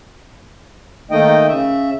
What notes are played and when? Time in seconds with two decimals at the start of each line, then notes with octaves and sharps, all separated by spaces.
1.11 D#3 A3 A#3 D#4 D#5 G5
1.48 C#3 E5